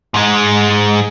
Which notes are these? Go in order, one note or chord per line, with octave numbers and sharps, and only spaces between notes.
G#2 G#3